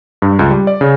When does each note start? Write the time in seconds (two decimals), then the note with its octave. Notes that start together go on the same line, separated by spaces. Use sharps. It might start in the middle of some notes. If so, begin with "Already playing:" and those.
0.22 G2
0.39 C#2
0.51 G3
0.67 D5
0.81 C#3